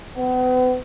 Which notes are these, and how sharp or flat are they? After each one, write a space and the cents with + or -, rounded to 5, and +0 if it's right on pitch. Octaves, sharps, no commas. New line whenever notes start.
B3 +40